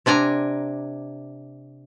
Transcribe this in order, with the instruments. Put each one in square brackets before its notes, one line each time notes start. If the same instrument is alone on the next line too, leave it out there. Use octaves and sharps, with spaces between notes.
[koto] C3 D4 G#5 A#5